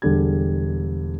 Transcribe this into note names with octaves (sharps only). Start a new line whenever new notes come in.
E1 D3 G3 G#4 G#6